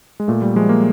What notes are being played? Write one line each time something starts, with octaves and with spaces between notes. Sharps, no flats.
G#3
A#2 A3
G3
F3 G#3
A#3